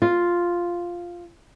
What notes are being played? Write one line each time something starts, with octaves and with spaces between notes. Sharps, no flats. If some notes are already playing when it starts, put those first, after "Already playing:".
F4